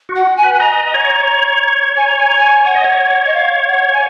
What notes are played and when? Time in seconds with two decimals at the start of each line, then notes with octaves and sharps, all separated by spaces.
0.09 F#4
0.15 F#5
0.37 G#5
0.43 B4
0.53 G#5
0.60 D#5 A#5
0.94 C#5
1.96 G#5
2.07 A#5
2.17 G#5
2.27 A#5
2.38 G#5
2.65 C#5 F#5
2.75 D#5
2.84 C#5
3.26 D#5
3.33 F5
3.67 F#5
3.93 G#5